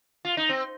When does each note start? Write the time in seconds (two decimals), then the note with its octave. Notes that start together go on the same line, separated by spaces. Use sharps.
0.25 F4
0.37 D#4
0.49 C4